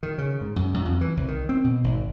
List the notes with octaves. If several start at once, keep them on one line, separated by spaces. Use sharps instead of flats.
D#3
C#3
G#2
F#2
F#2
F2
E3
C2
D#3
C4
B2
G#1